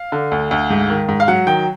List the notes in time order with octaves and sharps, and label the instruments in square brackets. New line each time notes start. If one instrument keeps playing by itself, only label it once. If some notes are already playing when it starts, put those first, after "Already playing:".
Already playing: [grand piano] F5
D3
D2
D2
G#2
D#3
G#2
F5
F#3 F#5
D#3 G5